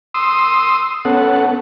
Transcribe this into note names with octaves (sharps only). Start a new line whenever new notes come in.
C6 D#6 E6
B3 C#4 A4 F#5